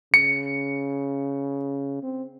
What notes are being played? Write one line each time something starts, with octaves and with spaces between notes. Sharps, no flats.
C#3 C#7
C4